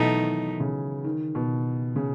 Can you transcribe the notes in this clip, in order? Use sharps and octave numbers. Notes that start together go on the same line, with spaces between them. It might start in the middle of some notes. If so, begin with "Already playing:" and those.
Already playing: B2 E3 F#3 A3 B3 D#4
D#3
C#3
D#3
B2
C#3